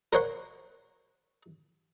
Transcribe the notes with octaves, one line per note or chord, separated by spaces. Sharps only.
A#4 C5 C#5 F#5 C6